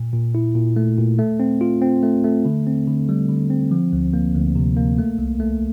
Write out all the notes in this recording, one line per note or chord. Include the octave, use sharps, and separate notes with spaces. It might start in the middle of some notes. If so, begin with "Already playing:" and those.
Already playing: A#2
A#2
E4
A#2
A3
A#2
A3
C4
F4
C4
A3
A3
D3
C4
D3
G3
D3
C4
F3
D2
A#3
D2
C3
A#3
A3
C2
A3